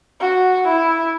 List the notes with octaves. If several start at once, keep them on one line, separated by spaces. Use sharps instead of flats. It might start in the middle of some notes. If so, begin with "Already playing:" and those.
F#4
E4